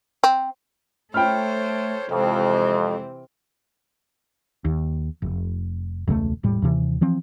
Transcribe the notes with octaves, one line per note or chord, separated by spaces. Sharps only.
C4
A3 A4 C5 C#5 G5 B5 F6
F2 C3 E3 G#3 C4
D#2
F1
E1 C#2 D#3 A3
E1 A2 G3
D#2 C3 E3
E3 F3 C4